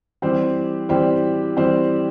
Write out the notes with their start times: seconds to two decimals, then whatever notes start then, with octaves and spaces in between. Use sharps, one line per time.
0.22 E3 G3 C4 G4 C5
0.89 E3 G3 C4 G4 C5
1.56 E3 G3 C4 G4 C5